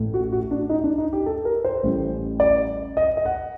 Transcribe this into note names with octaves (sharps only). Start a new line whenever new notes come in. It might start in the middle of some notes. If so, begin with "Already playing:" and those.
Already playing: A1 A2 A3
F#4
F#4
D4
D#4
D4
D#4
G4
A4
A#4
C5
A1 A2 G3
D5
D#5
D#5
F#5